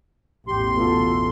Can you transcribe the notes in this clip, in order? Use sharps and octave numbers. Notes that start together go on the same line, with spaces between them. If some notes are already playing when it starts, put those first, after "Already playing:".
A1 E2 G4 C6
B2 F4 A4